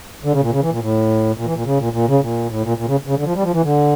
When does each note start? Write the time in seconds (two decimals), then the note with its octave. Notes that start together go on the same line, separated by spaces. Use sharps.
0.24 D3
0.33 C#3
0.42 A#2
0.52 C#3
0.62 E3
0.71 A#2
0.81 A2
1.37 A#2
1.46 E3
1.55 A#2
1.66 C#3
1.79 A#2
1.93 A#2
2.08 C#3
2.22 A#2
2.50 A2
2.63 A#2
2.78 A#2
2.88 C#3
3.07 C#3
3.16 D3
3.25 F3
3.35 G3
3.43 F3
3.53 E3
3.63 D3